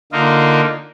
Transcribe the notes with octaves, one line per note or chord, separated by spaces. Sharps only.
D3 A#3 D#4 F4